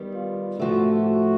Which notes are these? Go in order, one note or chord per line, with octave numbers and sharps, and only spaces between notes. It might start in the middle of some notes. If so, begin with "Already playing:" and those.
Already playing: D#3 G3 B3
F4
A2 F3 A3 F#4
F#4